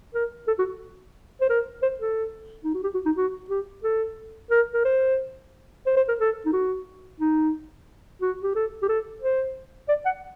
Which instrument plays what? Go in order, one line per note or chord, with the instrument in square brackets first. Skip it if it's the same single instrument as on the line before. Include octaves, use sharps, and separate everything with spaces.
[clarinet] A#4
A4
F#4
C5
A#4
C5
A4
D#4
F#4
G4
F#4
D#4
F#4
G4
A4
A#4
A#4
C5
C5
C5
A#4
A4
D#4
F#4
D#4
F#4
G4
A4
G4
A4
C5
D5
F#5